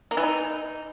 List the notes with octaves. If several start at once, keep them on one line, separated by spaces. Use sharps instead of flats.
A#3
E3
D#4